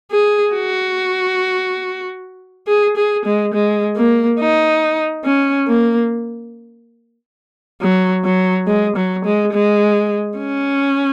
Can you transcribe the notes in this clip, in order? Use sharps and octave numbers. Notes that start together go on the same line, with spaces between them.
G#4
F#4
G#4
G#4
G#3
G#3
A#3
D#4
C#4
A#3
F#3
F#3
G#3
F#3
G#3
G#3
C#4